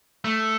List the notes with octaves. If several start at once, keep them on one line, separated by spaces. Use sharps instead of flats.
A3